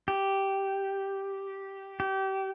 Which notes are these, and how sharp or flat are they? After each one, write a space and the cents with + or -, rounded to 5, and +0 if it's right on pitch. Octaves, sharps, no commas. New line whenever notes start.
G4 -5
G4 -25